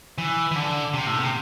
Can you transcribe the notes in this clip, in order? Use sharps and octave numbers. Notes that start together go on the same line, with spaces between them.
E3
E3
D3
C3
A2
C3